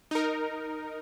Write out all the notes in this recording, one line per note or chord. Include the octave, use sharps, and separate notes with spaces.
D#4 A#4